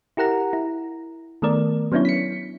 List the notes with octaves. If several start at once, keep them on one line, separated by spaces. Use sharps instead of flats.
E4 G4 A#4 F#5 A#5
E4
D#3 A3 B3 A#4 D5
F#3 B3 C#4 D4 E4 C#5
B6 C#7